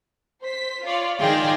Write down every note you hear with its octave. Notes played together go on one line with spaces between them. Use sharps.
C5 B6
F4 C#5 D5
D#3 F4 G#4 D5 G5